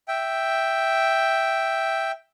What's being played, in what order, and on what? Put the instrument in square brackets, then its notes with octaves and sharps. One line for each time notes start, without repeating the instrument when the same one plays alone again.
[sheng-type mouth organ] E5 G5